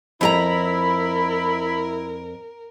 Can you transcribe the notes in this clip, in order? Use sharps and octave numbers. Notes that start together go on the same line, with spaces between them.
F2 E4 G4 A#4 A#5 B5